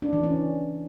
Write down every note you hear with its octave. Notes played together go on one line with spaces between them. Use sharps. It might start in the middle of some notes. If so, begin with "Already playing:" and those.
D4
E3
C#4